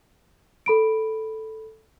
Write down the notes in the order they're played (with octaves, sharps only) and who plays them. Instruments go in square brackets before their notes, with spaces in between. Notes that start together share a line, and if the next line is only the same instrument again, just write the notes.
[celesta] A4 B5 D7